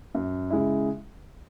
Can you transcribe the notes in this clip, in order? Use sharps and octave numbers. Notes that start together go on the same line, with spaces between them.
F#2
C#3 G#3 E4